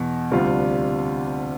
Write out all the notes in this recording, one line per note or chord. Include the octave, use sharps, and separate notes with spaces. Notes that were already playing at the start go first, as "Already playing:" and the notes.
Already playing: E2 B2
D2 C3 G3 D4 F4